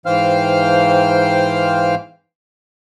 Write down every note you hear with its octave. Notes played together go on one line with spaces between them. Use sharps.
G#2 E3 C5 F5 G5 F6